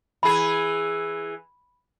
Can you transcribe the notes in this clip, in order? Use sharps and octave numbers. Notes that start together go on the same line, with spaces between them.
E3 G#4 B5